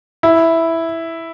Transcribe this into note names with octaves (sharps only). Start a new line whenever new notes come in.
E4